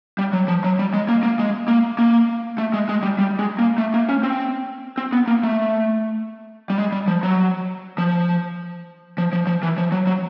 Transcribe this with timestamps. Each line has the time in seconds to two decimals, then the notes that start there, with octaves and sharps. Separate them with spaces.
0.19 G3
0.33 F#3
0.48 F3
0.64 F#3
0.79 G3
0.94 G#3
1.09 A#3
1.23 A#3
1.39 G#3
1.68 A#3
1.99 A#3
2.58 A3
2.73 G#3
2.89 G#3
3.03 G3
3.18 G3
3.39 G#3
3.59 A#3
3.78 A3
3.94 A#3
4.09 C#4
4.23 C4
4.98 C4
5.13 B3
5.27 A#3
5.43 A3
6.70 G3
6.78 G#3
6.92 G3
7.08 F3
7.23 F#3
7.98 F3
9.18 F3
9.33 F3
9.47 F3
9.63 E3
9.78 F3
9.92 F#3
10.07 F#3